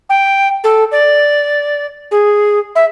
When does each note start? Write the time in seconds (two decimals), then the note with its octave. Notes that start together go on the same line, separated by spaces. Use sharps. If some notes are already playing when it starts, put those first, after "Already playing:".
0.09 G5
0.64 A4
0.92 D5
2.11 G#4
2.75 E5